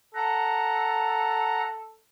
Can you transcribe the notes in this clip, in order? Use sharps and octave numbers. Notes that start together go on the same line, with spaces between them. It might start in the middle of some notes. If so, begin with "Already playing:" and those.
A4 F#5 A#5